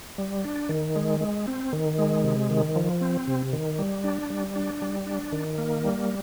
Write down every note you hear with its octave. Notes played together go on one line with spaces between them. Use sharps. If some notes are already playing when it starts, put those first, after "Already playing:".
G3
D4
D#3
G#3
G#3
C4
D#3
G#3
C3
D#3
F3
C4
C3
D#3
G3
D4
G3
D4
G3
D4
D#3
A#3
G3